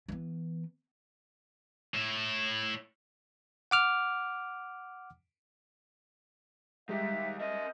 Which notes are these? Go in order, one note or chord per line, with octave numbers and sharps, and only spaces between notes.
E3 B3
A2 E4
F#5 D6 F6
D#3 G3 G#3 G4 E5
A#4 D#5 E5